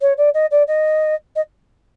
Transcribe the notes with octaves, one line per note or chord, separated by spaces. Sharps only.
C#5
D5
D#5
D5
D#5
D#5